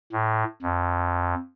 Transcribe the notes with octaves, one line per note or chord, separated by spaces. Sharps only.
A2
F2